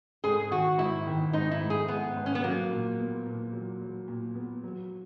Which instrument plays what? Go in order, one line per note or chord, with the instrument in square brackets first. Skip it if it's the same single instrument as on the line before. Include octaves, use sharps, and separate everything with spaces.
[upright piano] G#2 [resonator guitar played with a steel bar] G#4
[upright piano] D#3 [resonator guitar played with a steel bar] F#4
[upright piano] G#2 [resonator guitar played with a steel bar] E4
[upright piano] D#3
[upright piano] G#2 [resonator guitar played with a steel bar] D#4
[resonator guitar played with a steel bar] E4
[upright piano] G#2
[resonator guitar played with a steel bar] G#4
[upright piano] G#2 [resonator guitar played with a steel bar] B3
[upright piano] G#2
[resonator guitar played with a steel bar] C#4
B3
[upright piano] F#3 [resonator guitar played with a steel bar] A#3
[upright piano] A#2
B3
A#2
F#3
F#3
A#2
B3
F#3